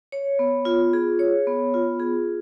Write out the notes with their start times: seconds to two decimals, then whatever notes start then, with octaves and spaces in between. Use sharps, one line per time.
0.12 C#5
0.39 B3
0.65 F4
0.93 G#4
1.19 C#5
1.47 B3
1.74 F4
2.00 G#4